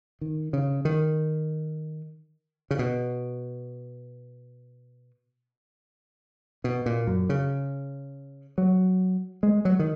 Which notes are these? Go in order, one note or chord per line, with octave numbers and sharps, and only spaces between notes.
D#3
C#3
D#3
C#3
B2
B2
A#2
F#2
C#3
F#3
G#3
F#3
D#3